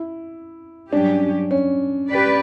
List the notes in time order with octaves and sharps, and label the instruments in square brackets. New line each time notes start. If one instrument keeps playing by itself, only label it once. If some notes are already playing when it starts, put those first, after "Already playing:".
Already playing: [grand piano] E4
[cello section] G2 F#3 C#4 G4 [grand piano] D4
[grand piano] C#4
[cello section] G4 B4 D5